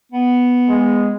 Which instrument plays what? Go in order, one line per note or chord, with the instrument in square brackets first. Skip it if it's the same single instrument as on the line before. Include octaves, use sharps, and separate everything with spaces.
[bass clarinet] B3
[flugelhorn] G#3